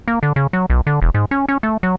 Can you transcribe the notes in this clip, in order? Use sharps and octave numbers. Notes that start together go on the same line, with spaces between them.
A#3
D3
C#3
F#3
B1
D3
E1
G#2
C#4
C#4
A3
F#3